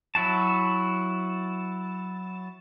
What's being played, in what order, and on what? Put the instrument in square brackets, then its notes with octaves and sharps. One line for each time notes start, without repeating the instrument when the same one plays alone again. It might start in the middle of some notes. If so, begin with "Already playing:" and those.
[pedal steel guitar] F#3 E4 F#4 A5